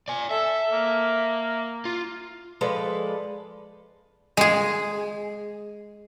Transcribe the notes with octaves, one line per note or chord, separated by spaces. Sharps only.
D5 G#5
A4 E5
A#3
F4
F3 G#3 A4 B4 D5
G#3 G#4